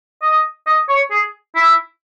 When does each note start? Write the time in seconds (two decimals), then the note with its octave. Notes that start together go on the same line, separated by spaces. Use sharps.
0.22 D#5
0.67 D#5
0.89 C#5
1.11 G#4
1.55 E4